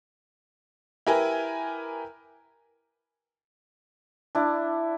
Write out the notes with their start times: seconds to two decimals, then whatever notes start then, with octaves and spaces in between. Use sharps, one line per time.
1.07 E4 G4 A#4 B4 G#5
4.35 D4 E4